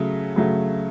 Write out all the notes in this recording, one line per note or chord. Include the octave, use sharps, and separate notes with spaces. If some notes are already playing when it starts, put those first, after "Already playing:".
Already playing: C#3 F#3 A3
C#3 F#3 A3